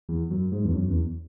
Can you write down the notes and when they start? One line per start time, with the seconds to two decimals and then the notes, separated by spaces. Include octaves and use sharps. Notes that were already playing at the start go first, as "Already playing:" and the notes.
0.09 E2
0.31 F#2
0.52 G#2
0.65 E2
0.74 F#2
0.89 E2